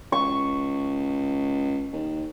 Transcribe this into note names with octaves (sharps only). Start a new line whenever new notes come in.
C#2 C#6
D#2